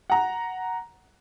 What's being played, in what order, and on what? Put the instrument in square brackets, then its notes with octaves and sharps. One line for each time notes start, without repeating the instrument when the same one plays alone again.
[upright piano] F#5 A#5